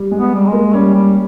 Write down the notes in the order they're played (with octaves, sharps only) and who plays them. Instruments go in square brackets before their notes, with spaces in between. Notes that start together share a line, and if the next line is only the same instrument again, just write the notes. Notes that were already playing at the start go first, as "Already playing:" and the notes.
Already playing: [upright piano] G3
G#3
[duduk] B3
G3
G#3
[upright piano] A#3
[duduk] G3 [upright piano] C#4
[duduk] G3